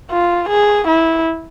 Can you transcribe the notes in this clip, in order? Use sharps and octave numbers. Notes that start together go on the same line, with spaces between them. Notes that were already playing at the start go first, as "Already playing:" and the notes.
F4
G#4
E4